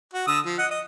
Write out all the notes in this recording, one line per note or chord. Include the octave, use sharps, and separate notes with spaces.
F#4
D3 D#6 E6
F3
D#5 F#5
D#5